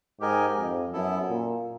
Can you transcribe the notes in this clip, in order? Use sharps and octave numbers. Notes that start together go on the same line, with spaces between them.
G#2 G4 A#4 D#5 G#5
F2
F#2 B3 E4 A4
A#2